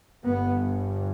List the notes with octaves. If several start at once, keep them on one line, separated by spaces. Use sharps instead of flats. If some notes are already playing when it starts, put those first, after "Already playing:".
G1 G2 B3